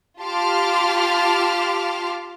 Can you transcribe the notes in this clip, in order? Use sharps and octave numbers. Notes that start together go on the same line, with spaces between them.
F4 G4 A5 C6 D6 F6